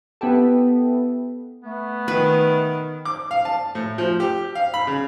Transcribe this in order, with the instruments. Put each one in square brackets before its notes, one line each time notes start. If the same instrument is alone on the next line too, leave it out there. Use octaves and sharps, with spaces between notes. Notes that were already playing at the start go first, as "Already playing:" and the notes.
[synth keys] B3 E4 G4 A4
[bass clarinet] A3 [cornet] B3
[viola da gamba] D#3 [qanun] B4
[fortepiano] D6
F5
A5
A2
F3
G4
F5
B5
C#3